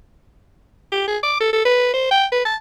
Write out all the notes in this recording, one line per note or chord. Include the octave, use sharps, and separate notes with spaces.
G4
G#4
D6
A4
A4
B4
C5
G5
B4
A5